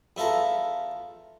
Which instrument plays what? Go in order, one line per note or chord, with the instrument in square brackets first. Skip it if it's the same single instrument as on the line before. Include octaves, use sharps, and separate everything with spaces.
[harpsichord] E2 E4 F4 A4 A#5